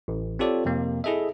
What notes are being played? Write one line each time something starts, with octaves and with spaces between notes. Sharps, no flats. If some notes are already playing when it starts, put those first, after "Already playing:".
A1
C4 F4 G4 A4 C#5 D5
F2 C3 A#3
E4 G#4 A4 D#5 E5